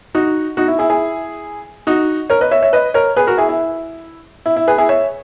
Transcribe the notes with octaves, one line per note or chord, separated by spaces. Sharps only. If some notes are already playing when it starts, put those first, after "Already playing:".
D#4 F#4
D#4 F#4
E4
E4 G#4
E4 G#4
D#4 F#4
A#4 C#5
B4 D#5
C#5 E5
C#5 E5
B4 D#5
A#4 C#5
G#4 B4
F#4 A#4
E4 G#4
E4
E4
E4
G#4 B4
E4 G#4
C#5 E5